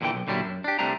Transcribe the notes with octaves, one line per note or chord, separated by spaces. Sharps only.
E2 A#2 D3 E3 G5
B1
A#2 D3 F#3 G3 E4
F#2
D4 G4
C2 C3 G3 A3 D4 A#5